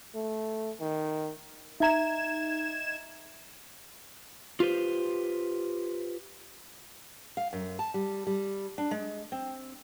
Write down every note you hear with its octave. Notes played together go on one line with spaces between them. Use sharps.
A3
D#3
D#4 E5 A#5 G#6 E7
F4 G4 B4 C5
F5
F#2
A5
G3
G3
D4
G#3
C4